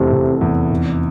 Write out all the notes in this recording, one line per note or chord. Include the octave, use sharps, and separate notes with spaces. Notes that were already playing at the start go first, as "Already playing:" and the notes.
Already playing: F1 E2 C3 E3 A3
F1
E2
F1